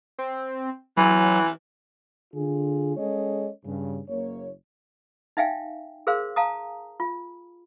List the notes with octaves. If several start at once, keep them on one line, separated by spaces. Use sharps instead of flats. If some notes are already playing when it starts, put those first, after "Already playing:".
C4
E3 F#3
D3 F4 G#4
G#3 C#4 G#4 A4 C#5 D#5
G2 C#3
F#1 A#3 C#5
D#4 E5 F5 G5 G#5
G#4 A#4 C5 F5 C6
F5 A5 A#5 D#6
F4